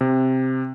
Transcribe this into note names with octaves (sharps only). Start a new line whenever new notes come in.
C3